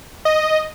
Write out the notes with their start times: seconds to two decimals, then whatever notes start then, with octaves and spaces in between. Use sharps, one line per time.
0.25 D#5